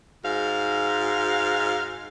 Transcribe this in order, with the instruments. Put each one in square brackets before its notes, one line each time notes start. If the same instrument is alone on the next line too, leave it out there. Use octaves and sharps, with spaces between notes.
[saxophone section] G#2 F#4 F5